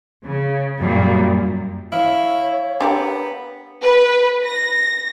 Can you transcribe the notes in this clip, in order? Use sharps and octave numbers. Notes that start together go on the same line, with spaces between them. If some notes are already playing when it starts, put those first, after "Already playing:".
C#3
F#2 A#2 G3
E4 C#5 F5
B3 D4 G4 A#4
B4
A#6